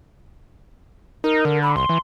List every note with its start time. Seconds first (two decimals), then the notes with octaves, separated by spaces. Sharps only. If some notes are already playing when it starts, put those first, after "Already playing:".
1.24 D#4 A#4
1.45 D3
1.62 B5
1.76 C2 C6
1.89 E3